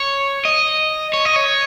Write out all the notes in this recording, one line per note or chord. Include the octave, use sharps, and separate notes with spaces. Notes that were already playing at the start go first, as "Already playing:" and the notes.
Already playing: C#5
D#5
C#5
D#5
C#5